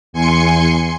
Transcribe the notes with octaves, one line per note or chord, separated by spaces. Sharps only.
E2 G#5 C6 C#7